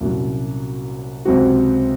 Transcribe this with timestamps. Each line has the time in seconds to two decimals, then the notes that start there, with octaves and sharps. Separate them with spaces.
0.01 C2 A#2 F#3 C#4
1.25 C#2 C3 F#3 C4 F#4